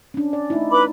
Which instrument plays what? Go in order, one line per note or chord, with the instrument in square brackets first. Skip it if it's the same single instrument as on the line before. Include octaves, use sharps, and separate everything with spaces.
[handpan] C#4 D4
D5
A3 D#4 E4
[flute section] B4 B5 D6